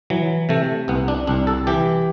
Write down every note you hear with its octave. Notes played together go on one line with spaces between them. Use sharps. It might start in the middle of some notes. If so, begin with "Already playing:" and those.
E3 F#3
C3 A3
C2 B3
D4
C2 D4
A4
E3 G4